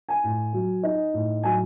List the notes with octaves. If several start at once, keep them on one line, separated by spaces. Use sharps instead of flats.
G#5
A2
F#3
D#4
A2
F#3 G#5